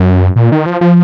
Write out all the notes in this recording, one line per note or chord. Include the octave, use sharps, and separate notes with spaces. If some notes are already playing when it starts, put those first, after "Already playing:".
Already playing: F#2
A#2
D#3
F3
F3